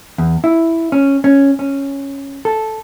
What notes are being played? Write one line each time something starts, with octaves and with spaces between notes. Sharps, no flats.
E2
E4
C#4
C#4
C#4
A4